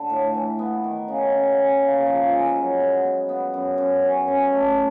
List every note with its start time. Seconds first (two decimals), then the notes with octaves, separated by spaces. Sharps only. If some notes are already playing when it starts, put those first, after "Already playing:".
Already playing: D3
0.10 A2
0.34 E3
0.59 B3
0.84 D#3
1.08 C#3
1.32 C#3
1.58 C#4
1.82 A#3
2.06 F3
2.31 G#3
2.56 F#3
2.80 B3
3.04 B3
3.29 B3
3.54 F#2
3.78 F#2
4.03 C#4
4.28 C#4
4.52 A3